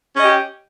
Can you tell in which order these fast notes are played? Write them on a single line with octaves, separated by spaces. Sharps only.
C#4 D#5 G4